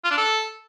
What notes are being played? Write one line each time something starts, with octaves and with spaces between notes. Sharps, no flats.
F4
D4
A4